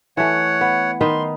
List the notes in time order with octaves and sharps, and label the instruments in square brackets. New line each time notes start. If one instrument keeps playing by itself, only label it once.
[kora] E3 A3 [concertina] C#5 F#5
[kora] B3
[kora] D#3 D#4 B4 [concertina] C6